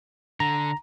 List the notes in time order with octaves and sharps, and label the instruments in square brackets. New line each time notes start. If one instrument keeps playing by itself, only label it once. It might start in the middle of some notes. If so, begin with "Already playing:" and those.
[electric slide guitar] D3 [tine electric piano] A#5